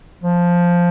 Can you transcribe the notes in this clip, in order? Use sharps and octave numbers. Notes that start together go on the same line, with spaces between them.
F3